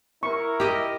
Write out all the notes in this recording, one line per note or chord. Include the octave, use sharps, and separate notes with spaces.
E4 A#4 C#6
G4 D#5